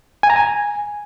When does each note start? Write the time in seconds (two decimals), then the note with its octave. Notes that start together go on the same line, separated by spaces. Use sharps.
0.23 G#5
0.30 A#5
0.36 G#5